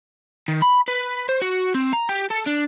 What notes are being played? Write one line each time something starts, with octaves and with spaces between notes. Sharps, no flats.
D#3
B5
B4
C5
F#4
C4
A#5
G4
A4
D4